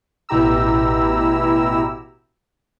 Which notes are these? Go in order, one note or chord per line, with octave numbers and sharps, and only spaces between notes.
A1 B2 E4 G4 A#5 E6